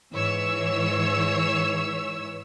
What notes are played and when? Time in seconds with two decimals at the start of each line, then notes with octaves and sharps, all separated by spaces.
0.13 G#2 E3 C#5 E6